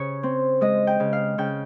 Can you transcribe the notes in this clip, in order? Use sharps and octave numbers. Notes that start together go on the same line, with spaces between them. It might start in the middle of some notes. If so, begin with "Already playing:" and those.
Already playing: C#3 C#5
C4
G#3 D#5
G5
C#3
F5
C#3 G5